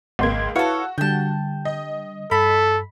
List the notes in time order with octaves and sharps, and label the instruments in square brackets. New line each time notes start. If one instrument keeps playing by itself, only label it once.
[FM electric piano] G#1 C6 G#6 [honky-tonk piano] C#2 A#3
[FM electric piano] E4 B4 F5 [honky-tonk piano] F#4 [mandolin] A4 C#5
[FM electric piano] D3 G3 [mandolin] G5 A5
[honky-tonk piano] D#5
[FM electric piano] G2 [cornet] A4 [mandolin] B5